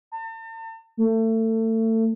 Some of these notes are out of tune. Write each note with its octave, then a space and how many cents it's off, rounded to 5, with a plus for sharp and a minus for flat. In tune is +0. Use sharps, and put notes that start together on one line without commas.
A5 +45
A3 +30